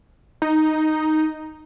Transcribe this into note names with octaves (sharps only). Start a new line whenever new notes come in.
D#4